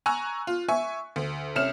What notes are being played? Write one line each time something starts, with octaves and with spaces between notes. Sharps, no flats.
G#5 A#5 C#6 E6 F#6
F4
E5 G#5 C#6
D2
C2 C#4 E5 F6 E7